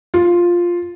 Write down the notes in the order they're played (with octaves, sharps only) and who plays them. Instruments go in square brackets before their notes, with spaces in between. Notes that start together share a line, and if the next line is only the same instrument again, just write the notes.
[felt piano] F4